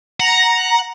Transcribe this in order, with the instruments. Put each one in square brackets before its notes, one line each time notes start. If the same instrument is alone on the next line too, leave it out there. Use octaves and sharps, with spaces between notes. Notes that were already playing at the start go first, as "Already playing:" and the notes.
[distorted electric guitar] F#5 [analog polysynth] A#5